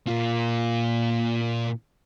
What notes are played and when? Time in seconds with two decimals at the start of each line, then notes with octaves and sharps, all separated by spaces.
0.07 A#2 F4